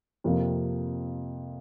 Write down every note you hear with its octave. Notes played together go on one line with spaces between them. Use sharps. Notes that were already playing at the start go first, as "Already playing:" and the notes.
F2 C3 F3 A#3